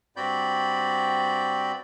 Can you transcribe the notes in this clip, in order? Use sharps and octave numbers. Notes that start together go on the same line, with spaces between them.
G2 C4 F#4 D5 B5 G6